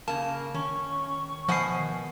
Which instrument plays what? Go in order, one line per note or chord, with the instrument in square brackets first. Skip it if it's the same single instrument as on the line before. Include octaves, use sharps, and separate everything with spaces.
[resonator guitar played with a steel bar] C#3 A#3 [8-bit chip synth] A5
[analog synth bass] D#3 [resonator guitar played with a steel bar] C#4 [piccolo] C#6
[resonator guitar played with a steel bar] B2 F#5 G#5 [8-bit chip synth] F3 C7